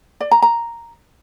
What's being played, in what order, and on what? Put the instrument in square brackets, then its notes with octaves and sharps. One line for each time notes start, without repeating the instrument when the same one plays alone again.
[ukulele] D5
A#5
A#5